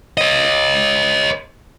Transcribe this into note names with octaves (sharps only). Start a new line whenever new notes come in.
C#5 D#5